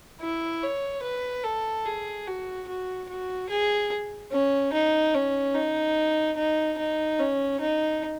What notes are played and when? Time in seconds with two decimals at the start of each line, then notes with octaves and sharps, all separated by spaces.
0.21 E4
0.63 C#5
1.03 B4
1.44 A4
1.86 G#4
2.27 F#4
2.68 F#4
3.09 F#4
3.50 G#4
4.32 C#4
4.73 D#4
5.15 C#4
5.56 D#4
6.37 D#4
6.78 D#4
7.19 C#4
7.61 D#4